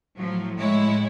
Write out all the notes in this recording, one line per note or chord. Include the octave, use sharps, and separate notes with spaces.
A2 F3 F#3
G#3 E4 C#5